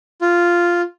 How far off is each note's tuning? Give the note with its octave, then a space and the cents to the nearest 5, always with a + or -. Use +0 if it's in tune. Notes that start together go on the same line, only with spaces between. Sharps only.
F4 -5